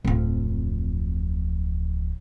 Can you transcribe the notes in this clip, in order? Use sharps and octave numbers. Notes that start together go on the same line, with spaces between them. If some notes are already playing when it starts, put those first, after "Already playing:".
D1 F2